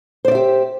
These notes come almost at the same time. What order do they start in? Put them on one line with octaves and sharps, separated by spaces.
C5 D5 E5 G4